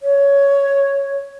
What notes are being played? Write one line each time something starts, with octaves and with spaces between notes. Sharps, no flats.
C#5